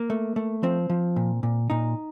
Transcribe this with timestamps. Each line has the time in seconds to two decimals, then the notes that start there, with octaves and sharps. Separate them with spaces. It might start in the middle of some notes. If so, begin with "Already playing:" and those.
Already playing: A#3
0.10 A3
0.36 A3
0.63 F3 C4
0.90 F3
1.16 A#2
1.43 A#2
1.70 A#2 D#4